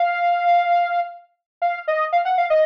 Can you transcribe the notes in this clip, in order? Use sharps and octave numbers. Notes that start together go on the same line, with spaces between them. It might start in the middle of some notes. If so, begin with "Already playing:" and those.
Already playing: F5
F5
D#5
F5
F#5
F5
D#5